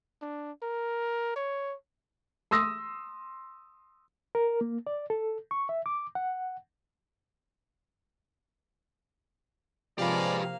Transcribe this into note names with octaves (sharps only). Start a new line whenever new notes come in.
D4
A#4
C#5
C6 D#6 E6 A#6
A#4
A#3
D5
A4
C#6
E5
D6
F#5
C3 F3 G#3 A#3 G4 B4 D5 F5